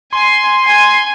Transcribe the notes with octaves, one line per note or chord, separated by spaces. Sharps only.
G#5 C6
G#5